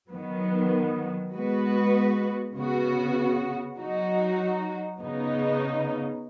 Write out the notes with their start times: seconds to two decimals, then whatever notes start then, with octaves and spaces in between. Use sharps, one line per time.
0.12 D#3 F#3 B3
1.34 G#3 B3 F#4 B4
2.56 C#3 B3 F#4
3.78 F#3 D#4 F#4
5.00 C#3 B3 D#4